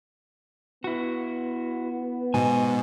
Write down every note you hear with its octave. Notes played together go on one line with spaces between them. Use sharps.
B3 E4 F#4
G#2 B2 G#5